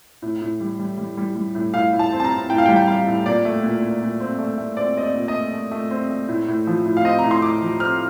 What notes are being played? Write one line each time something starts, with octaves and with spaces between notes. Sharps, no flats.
A2
A2
G3
G3
G3
G3
G3
A2
A2 F5
A2
A5
C4
A5
A#5
C4
A2 G5
F5
G5
G3
G5
G3 F5
A2
A#2 D5
A3
A#2
A#2
A#2
C4
A3
A3
C4 D5
C4 D#5
D5
A#2
D#5
A3
A3
A3
C4
A3
A2
A2
F3
A2
F5
C4 D#5
A#5
A2
C6
A2 D6
F3
C4 F6